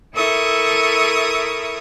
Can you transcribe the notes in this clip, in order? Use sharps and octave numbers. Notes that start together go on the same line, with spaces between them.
E4 A4 A#4 E5 C#6 D#6